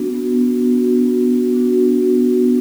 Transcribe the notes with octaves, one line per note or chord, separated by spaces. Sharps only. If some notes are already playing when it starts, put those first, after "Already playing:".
Already playing: B3 D4 F#4
B3
D4 F#4
B3
D4 F#4
B3